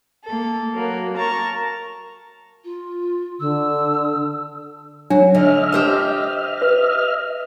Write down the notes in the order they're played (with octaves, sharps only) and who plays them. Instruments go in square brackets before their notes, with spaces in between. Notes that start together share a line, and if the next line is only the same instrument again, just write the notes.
[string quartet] A#3 A4
F#3 A#3 F#4
A#4 A5 A#5 C#6
[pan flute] F4
[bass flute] D3 [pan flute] E6
[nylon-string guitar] F#3 [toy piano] D4
[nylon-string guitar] D3 [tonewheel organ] D#5 E5 F6
[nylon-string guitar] G4 C5 A5
[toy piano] B4